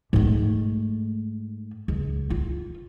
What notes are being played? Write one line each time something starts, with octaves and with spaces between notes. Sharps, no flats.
G#2 A3
C#2
F4